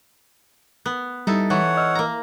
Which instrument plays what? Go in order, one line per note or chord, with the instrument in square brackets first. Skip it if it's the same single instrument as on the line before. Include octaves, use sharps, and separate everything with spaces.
[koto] B3
[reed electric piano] G3 [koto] D#4 E4 A4
[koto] E3 [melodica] C#5 F#5
[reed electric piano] D#5 E6 F6
[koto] A#3 A#5